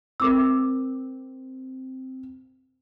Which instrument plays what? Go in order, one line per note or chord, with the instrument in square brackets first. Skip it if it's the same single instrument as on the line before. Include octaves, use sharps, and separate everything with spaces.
[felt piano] C4 [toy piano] A#4 D6 E6